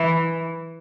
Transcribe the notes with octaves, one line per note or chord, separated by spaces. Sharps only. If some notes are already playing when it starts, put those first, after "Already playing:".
Already playing: E3